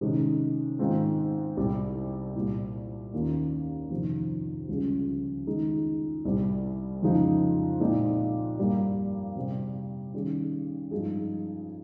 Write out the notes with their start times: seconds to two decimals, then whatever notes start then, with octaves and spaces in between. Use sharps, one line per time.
0.01 C3 D#3 G#3 C#4 G#4
0.79 G#2 D#3 G#3 C4 F4
1.57 C2 C3 G3 C4
2.35 C2 A#2 G3
3.13 D#2 D#3 A#3 C#4 F4
3.90 F2 C3 D#3
4.68 C#2 C#3 G3 C#4 G#4
5.47 D#3 G#3 D#4 G#4
6.25 C2 C3 G3
7.02 F2 C#3 F3 G#3 D#4
7.80 A#2 G#3 C4 D#4
8.58 G2 G3 A#3
9.35 C3 G3 C4
10.14 D#3 G3 C#4 G#4
10.91 G2 F3 G#3 D#4 G#4